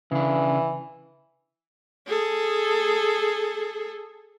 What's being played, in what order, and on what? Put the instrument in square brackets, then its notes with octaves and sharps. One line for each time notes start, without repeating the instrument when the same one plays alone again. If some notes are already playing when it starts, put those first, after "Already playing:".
[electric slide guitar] C#3 D4 [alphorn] E3
[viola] G#4 A4